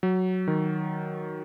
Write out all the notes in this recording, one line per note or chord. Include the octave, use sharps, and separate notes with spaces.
F#3
D#3